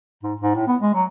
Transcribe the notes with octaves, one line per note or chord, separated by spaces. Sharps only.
G#2
G#2
A2
B3
G#3
F#3